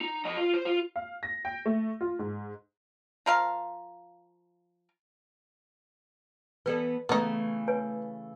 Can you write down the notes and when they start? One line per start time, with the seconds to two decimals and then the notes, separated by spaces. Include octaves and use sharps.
0.01 D#4
0.25 F3 D#5
0.37 F4
0.54 C5
0.65 F4
0.96 F5
1.23 A#6
1.45 G5
1.66 A3
2.01 F4
2.19 G#2
3.26 F3 A#4 F5
6.66 E3 B3 A4 B4 D5
7.09 C#3 E3 A3 B3 D#4
7.68 B4 C#5 G#5